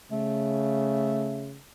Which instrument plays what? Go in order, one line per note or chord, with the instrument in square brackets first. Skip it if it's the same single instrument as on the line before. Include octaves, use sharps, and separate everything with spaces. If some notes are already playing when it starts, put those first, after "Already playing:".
[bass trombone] C#3 [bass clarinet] A3